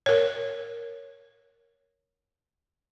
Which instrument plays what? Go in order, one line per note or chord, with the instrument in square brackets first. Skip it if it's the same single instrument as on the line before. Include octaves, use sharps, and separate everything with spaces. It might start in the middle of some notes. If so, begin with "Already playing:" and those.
[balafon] A#4 C#5